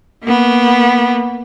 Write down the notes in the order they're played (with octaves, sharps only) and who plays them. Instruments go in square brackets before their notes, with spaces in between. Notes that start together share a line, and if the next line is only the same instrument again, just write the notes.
[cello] A#3 B3